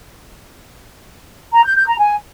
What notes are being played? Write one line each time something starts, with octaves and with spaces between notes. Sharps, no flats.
A#5
G6
G6
A#5
G#5